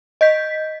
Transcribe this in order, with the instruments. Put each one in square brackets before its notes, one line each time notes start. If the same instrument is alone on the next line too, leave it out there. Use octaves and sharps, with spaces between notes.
[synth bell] D#5 G6 B6